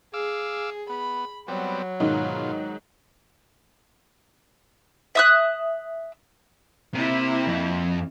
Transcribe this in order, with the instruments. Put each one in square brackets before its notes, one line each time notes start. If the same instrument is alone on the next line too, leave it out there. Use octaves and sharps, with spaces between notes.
[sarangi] G#4 [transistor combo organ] F5 D6 E6
[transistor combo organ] B3 [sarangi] B5
[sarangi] F#3 [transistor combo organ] G3 B3 C4
[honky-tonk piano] G#2 D#3 D#4 [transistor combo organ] B2 F4
[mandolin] E5 D#6 F#6
[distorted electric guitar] C3 [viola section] A#3 E4
[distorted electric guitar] F2